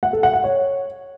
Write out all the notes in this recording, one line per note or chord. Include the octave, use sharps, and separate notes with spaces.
F#5
A4
F#5
F#5
C#5